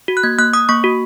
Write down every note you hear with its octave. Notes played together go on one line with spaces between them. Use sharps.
F#4
F#6
A#3 G#6
A#3 F#6
A#3 D#6
A#3 C#6
F#4